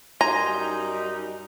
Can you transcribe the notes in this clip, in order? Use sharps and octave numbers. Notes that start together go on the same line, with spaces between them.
F#2 G3 D#4 G#5 A#5 C6